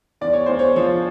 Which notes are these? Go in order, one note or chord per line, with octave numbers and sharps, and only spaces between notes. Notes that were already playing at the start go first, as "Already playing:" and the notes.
E2 D5
C#5
E2 C5
C#5
F3 C#5